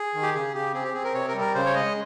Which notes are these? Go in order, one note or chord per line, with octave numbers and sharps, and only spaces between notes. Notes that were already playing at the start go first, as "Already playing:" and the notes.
Already playing: G#4
D#3
G4
C#3 G#4
C#3 G4
C4 G#4
G4
C4 G#4
A#4
C3 C#5
A#4
G3
A#4
C#3 C5
C#5
G#3 D#5